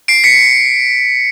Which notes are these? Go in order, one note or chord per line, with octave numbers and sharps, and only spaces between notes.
C7 D7
B6 C#7